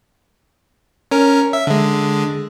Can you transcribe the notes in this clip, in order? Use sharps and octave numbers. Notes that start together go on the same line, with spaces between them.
C#4 A#4
E5
D3 G#3